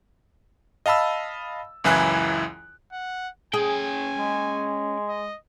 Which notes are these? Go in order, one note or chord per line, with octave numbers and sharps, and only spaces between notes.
D#5 F5 A5 B5 E6
C#2 F#2 E3 E4 G#5 F#6
F#5
C#4 G#4 G5 G#5
G#3
D#5